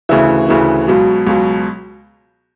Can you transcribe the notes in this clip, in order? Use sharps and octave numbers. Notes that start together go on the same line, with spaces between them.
D2 C#3 E3 E5
D2 C#3 E3
C#2 B2 F#3
C#2 B2 F#3